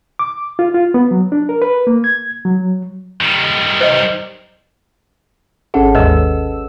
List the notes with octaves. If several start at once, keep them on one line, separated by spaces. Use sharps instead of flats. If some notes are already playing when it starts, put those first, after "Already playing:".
D6
F4
F4
B3
F#3
D4
A#4
B4
A#3
G#6
F#3
D#3 G3
C5 D#5
G#1 C#4 G#4 A4 F#5
D#2 G#2 B4 D#5 E6